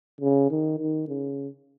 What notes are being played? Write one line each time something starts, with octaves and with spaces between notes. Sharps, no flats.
C#3
D#3
D#3
C#3